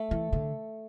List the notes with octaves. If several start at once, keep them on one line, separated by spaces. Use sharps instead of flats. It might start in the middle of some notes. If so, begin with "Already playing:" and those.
Already playing: A3 A4
E3
D3